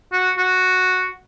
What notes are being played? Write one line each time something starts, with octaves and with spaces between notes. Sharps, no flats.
F#4
F#4